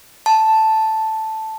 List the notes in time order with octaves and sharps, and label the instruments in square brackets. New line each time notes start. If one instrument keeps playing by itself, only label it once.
[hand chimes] A5